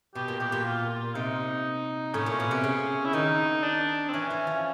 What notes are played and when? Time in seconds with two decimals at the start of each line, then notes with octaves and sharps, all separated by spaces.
0.15 B2 G4
0.28 A#2
0.40 B2 G4
0.52 A#2
0.65 F4
0.90 F4
1.15 C3 D#4
2.14 A2 C#4
2.26 A#2
2.40 B2
2.51 C3
2.64 C#3
3.05 E4
3.13 D#3 D#4
3.63 D4
4.09 C4
4.13 E3 C#4
4.30 E3
4.47 F3